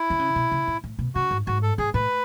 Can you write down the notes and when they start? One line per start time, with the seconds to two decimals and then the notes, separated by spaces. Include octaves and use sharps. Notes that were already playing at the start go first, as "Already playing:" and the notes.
Already playing: E4
0.10 D3
0.19 C#3
0.36 B2
0.51 C#3
0.68 A2
0.84 A2
0.99 B2
1.15 C#3 F#4
1.31 G#2
1.47 G#2 F#4
1.63 A4
1.78 G#2 G#4
1.94 A2 B4